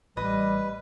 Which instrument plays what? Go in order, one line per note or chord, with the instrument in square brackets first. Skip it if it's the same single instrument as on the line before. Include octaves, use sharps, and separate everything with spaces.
[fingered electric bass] A1 [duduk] G3 [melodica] B4 [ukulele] D#5